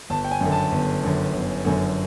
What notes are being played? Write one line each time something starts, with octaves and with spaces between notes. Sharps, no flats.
G1 A5
G5
G#5
F#2 D3
A5
G1
F#2 D3
G1
F#2 D3